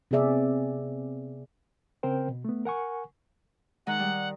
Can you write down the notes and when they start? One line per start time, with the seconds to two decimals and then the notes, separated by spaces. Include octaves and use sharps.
0.11 C3 B3 C4 G#4 D5 E5
2.03 C#3 C4 A#4 C5 G5
2.28 B2
2.45 A3 B3
2.65 A#4 F#5 G#5 C#6
3.87 D#3 G#3 D#4 F#5
3.99 G3